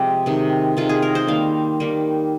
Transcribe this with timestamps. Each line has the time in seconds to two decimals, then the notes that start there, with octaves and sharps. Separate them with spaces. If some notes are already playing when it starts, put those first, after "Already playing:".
Already playing: C3 F3 G#3 G4
0.26 C3 D#3 G#3
0.77 C3 D#3 G#3 F4
0.89 G#4
1.02 A#4
1.15 C5
1.27 D#3 G3 A#3 F5
1.80 D#3 G3 A#3